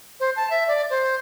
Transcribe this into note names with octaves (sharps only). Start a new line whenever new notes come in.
C5
A5
E5
D5
C5